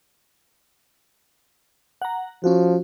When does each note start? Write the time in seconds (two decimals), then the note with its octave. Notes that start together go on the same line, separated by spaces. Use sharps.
2.02 F#5 A#5
2.44 F3 C#4 F#4